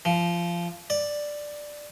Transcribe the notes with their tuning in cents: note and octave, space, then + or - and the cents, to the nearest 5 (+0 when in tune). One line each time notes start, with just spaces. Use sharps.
F3 -20
D5 +5